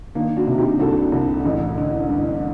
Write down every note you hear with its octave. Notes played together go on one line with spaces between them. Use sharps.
D#3 A#3 D4
D4 F#4
C3
D#4 G4
C2 F#4 A4
C2
A1
D3
G2